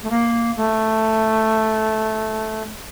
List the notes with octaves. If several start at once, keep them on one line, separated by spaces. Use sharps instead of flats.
A3
A#3
A3